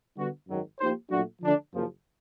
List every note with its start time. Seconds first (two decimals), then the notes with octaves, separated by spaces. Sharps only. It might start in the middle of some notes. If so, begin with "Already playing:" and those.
0.16 D3 G3 B3 D4 F#4
0.47 G#1 F#2 D#3 F#3
0.79 F3 A#3 D#4 G4 C5
1.10 A#2 F#3 A3 D4 F#4
1.41 D3 F3 A3 D4
1.72 F#1 F#2 C#3 F3 A#3